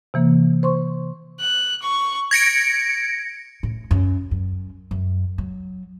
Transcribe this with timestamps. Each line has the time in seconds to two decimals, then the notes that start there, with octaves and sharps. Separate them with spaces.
0.14 C3 E3 A#3
0.63 C5 C6 C#6
1.40 F#6
1.82 C#6
2.31 G#6 A#6 C#7 D7
3.63 A2
3.91 F#2
4.31 F#2
4.91 F#2
5.38 F#3